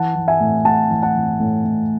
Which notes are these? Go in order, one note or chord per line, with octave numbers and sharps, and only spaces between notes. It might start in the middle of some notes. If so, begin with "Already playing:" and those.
Already playing: E3 F#5 A5
E3
E5 G#5
A2
A2 F#5 A5
E3
F#5 A5
E3
A2
A2